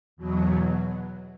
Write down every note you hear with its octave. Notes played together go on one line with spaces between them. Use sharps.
E2 B2 F#3